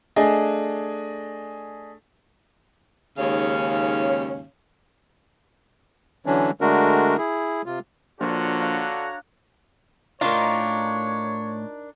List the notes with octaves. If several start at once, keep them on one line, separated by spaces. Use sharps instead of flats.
A3 D4 G#4 D#5 G#5
D#2 G#2 C#3 C#4 C#5 F5
D3 E3 F#3 C#4 D4
D3 G#3 A3 D4 F#4 A#4
E4 G#4
C3 F4
A#1 D3 F4 F#4 C#5 A#5
D4 F5 F#5
A2 D4 D#4 F4 A#4 C#5 G5 A#5